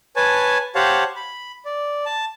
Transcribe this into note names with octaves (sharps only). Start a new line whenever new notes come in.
B4 C#5 G#5 A5
G4 C5 C#5 F5 F#5 A5
B5
D5
A5